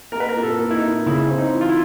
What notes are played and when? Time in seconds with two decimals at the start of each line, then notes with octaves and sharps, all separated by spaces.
0.12 A#3 A#4
0.20 B4
0.29 A#4
0.36 A#2
0.43 A4
0.59 A#3
0.71 E4
0.75 D#4
0.83 A#2
1.06 C#3 E4
1.30 C4
1.38 D#4
1.54 E3
1.61 F4
1.69 E4